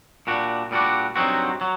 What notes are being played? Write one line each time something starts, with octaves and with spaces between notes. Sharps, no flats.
A#2 G3 D4 F#4
A#2 G3 D4 F#4
G2 F#3 C4 D#4 F#4
F#3